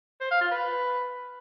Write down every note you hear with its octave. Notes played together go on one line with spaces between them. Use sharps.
C5
F5
F4
B4